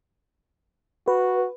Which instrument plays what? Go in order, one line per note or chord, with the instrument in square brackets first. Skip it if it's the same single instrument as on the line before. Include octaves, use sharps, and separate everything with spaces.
[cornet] F#4 [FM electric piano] B4